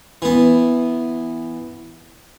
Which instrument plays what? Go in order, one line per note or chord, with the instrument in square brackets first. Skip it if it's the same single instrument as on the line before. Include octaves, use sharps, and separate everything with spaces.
[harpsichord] E3 B3